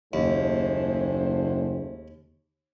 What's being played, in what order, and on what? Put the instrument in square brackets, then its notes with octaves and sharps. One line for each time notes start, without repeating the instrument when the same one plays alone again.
[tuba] F#1 [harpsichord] D#2 [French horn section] G#2 A3 C5